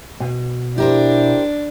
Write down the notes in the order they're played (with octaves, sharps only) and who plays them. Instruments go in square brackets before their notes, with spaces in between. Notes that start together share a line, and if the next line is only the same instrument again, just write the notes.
[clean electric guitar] B2
[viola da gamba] D4 [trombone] E4 [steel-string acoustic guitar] G4 A#4 C5